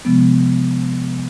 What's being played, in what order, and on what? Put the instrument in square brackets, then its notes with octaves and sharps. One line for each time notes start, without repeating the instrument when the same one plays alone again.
[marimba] C3 F3 G#3 B3